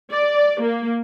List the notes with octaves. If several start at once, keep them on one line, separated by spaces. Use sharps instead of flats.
D5
A#3